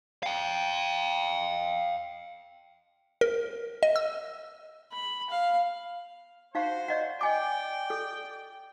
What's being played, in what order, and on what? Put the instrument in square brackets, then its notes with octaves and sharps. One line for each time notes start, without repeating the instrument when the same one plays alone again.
[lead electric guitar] F5 G5
[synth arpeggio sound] A#4
D#5
E6
[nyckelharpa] B5
F5
[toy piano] D#4 F5 [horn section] F#4 C5
[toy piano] D5 D#5 F#5
[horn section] D5 G5 [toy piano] D#5 G#5 D6
[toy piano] A4